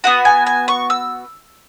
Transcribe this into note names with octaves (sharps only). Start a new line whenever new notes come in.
B3 F#4 F#5
G#5
G#5
C#6
E6